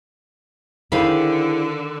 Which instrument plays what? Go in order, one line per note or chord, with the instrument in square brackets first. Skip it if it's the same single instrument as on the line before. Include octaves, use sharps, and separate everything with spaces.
[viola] D3 [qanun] D#3 F5 B5 [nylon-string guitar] E4 G#4 C5